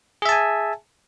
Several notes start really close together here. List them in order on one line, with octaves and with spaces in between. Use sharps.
G#4 E5 A5 G#5